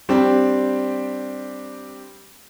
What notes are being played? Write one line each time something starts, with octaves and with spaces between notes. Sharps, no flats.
G3 C4 D4 G4